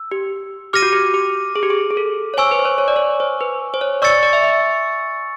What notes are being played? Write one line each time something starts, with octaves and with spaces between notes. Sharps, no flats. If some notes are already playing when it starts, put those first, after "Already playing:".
Already playing: E6
G4
G4 D6 F6 A#6 D#7
F#4
G4
G4
G#4
G4
G#4
G#4
A4
C#5
C5 G#5 C#6 E6
B4
C5
C#5
C#5
D5
C#5
C5
B4
C5
C#5
D5 C#6 E6 A6 C#7
D5
E5
E5